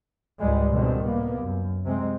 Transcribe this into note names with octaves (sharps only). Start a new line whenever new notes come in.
C#2 G#2 G3 G#3
B2 D3 D#3 G3 G#3 C4
A2 C3 A#3 B3
F#2
C3 G#3 C4